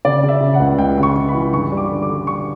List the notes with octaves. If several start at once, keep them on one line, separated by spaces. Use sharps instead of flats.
C#3 D5
C#3
E5
C#3
F#5
C#2
C#2 G5
C#3
C#6
C#3
B5
E3
G2 C#6
G3
D6
D3
D6
D3
G3 C#6